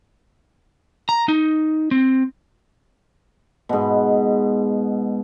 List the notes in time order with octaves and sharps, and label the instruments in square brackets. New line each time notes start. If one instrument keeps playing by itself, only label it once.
[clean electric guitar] A#5
D#4
C4
[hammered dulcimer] G#2 B2